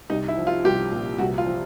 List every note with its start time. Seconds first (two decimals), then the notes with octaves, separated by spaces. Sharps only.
0.10 C2 D#4
0.28 E4
0.37 F3
0.47 F4
0.64 C2 G4
0.91 A#2
1.18 C2 F#4
1.38 F4
1.46 F3